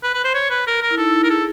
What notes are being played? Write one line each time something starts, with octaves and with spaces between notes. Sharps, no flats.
B4
B4
C5
C#5
B4
A#4
A#4
E4
D#4 A4
E4
A#4
G#4 A4